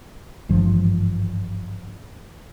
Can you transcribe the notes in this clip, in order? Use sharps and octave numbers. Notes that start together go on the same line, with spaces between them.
G#1 G2 E3 F3